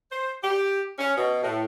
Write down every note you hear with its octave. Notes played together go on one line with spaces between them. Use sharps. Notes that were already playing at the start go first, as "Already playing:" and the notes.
C5
G4
C#4
B2
A2